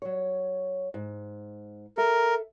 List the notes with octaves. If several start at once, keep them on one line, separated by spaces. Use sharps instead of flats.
F#3 C#5
G#2
A4 A#4 E5